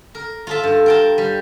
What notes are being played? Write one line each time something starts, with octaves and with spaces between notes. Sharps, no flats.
A#4
F4 A4 E5
G2
A#4 G5 A5
G3